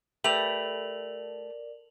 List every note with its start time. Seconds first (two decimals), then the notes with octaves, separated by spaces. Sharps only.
0.24 A3 G4 A#4 B4 D5 B5 F7 F#7